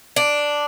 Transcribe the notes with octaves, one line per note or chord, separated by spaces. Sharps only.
D4